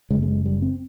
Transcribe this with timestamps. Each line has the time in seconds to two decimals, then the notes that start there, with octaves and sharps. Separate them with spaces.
0.11 F#1 F#2 C#3 G#3
0.22 A3
0.28 G#3
0.46 G3
0.62 C4